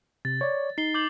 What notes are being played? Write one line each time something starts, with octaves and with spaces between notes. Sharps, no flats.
C3 A6
C#5 D5
D#4 C7 G7
D6 G6 F#7